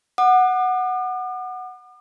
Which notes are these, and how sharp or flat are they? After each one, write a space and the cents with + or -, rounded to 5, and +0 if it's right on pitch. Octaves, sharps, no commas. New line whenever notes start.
F#5 +0 D6 +45